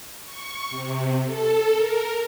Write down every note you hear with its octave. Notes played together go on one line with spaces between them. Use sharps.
C#6
C3
A4
A#4